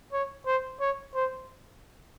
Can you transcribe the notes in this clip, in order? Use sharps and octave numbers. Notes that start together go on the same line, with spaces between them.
C#5
C5
C#5
C5